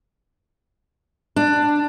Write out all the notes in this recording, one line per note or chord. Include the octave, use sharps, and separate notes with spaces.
D4